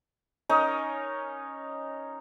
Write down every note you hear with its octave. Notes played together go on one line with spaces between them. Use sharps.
C#4 D#4 A#4 D#5